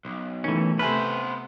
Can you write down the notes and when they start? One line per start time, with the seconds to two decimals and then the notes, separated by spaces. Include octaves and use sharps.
0.05 B1
0.44 D#3 E3 A3 C#4
0.79 C3 A3 B3 B4 C5 G#5 F6